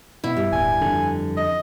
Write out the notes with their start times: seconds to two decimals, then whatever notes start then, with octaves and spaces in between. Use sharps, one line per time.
0.24 B2 E4
0.37 G2 G3
0.53 D1 G#5
0.81 F2 D3
1.37 D#5